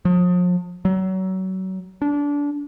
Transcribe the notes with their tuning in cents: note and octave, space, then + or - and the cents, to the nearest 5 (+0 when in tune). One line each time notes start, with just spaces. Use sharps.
F3 +40
F#3 +30
D4 -25